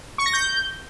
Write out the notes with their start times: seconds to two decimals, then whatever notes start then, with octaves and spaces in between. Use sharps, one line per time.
0.18 C#6
0.26 A#6
0.33 G6